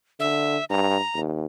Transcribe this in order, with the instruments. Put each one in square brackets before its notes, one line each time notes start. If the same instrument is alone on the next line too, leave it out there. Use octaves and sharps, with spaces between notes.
[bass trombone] D3 [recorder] E5
[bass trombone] G2 [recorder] A#5
[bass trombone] D#2